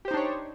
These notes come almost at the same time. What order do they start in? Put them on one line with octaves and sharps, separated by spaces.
G4 C5 D#4 D4 C#5